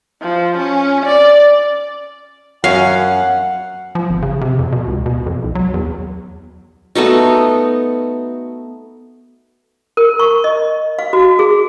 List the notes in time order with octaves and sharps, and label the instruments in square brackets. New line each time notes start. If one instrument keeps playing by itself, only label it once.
[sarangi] F3
C#4
D5
[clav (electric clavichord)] F#2 C#4 [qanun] F5 [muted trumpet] F#5
[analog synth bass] F3
G#1
C#3
C3
F2
B2
C#2
B2
F2
C2
F#3
E2
[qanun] A3 B3 D#4 F#4
[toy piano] A#4
C#6
D#5
F5
F#4
G#4